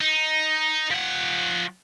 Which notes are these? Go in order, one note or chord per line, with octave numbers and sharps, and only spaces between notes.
D#4
F3 F#5